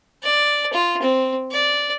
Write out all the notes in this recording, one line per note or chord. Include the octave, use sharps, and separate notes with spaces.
D5
F4
C4
D5